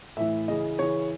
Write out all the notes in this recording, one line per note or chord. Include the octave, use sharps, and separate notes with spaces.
A2 E3 E5
C#3 E3 D#5
C#3 E3 C#5